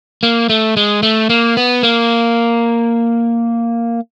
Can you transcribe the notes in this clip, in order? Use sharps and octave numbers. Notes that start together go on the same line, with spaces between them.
A#3
A3
G#3
A3
A#3
B3
A#3